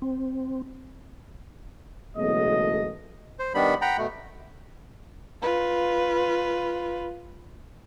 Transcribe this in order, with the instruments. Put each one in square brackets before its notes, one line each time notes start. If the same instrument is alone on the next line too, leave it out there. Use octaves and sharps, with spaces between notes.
[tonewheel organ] C4
[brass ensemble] F#1 B1 E2 G#3 A3 D#5
[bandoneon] C5
D#3 G3 B3 D4 B5
F#5 G5 A#5 B5
B2 A3
[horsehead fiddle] F4 B4